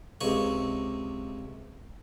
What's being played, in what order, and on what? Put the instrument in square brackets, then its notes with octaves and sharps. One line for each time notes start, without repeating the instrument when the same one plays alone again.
[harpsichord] C#2 C3 D#4 C#6